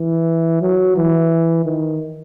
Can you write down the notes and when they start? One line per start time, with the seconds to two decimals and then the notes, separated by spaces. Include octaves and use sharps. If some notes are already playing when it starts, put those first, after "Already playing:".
Already playing: E3
0.62 F#3
0.97 E3
1.65 D#3